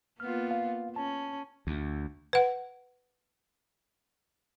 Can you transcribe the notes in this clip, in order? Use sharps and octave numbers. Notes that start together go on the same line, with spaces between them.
A#3 B3 F4 F6
F5
C#4 A5
D2
B4 F#5